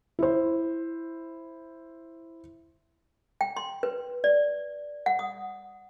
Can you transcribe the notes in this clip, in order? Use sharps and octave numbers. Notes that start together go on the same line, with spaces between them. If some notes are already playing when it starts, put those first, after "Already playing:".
E4 C5
G5
C6
B4
D5
F#5
D#6